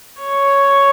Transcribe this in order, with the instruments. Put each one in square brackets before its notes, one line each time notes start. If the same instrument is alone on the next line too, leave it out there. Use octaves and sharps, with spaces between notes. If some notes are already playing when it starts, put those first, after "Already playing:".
[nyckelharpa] C#5